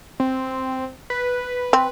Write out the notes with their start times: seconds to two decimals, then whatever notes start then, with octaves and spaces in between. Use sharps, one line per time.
0.20 C4
1.10 B4
1.73 C4